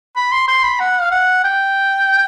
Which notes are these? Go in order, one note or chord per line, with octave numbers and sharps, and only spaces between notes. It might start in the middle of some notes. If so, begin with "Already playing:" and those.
B5
C6
C6
B5
F#5
F5
F#5
G5